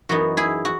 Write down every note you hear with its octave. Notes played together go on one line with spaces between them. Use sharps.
F#2 E3 B3 D#4 F#4
E4 G#4
F#4